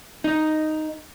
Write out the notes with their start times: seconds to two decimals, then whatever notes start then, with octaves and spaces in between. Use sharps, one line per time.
0.24 D#4